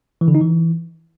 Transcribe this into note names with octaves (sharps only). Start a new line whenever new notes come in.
E3
D3
D#4
E3